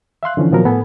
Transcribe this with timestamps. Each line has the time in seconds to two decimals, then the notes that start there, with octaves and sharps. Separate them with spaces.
0.23 E5 F5 C6 F#6
0.37 D3 E3 F3 C#4
0.51 A#2 D#3 F3 F#3 B3 A#4
0.65 A2 B3 A4 G#5